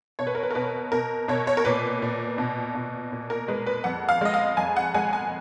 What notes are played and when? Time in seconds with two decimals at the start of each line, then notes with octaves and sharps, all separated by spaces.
0.19 B2 C#5
0.27 B4
0.35 A#4
0.43 B4
0.51 A#4
0.55 B2 B4
0.92 B2 A#4
1.28 B2 C#5
1.47 C#5
1.57 A#4
1.65 A#2 B4
2.02 A#2
2.38 B2
2.74 B2
3.12 A#2
3.30 A#4
3.48 G#3 B4
3.66 B4
3.84 F2 F#5
4.09 F5
4.21 G#3 D#5
4.34 F5
4.57 F2 G#5
4.77 F#5
4.95 G#3 G#5
5.13 G#5